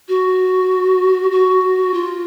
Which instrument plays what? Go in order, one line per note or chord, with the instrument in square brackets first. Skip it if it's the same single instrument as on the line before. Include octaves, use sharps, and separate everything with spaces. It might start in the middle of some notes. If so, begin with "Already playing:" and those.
[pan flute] F#4
F#4
F4